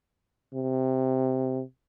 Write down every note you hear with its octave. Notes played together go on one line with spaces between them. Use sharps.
C3